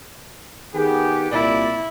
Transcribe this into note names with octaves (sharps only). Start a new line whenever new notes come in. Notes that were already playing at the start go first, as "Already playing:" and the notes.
D#3 B3 G4 G#4
C2 A#2 E4 D5